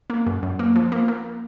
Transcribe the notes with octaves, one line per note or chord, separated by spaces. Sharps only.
A#3
F#2
F#2
A#3
F3
A#3
A#3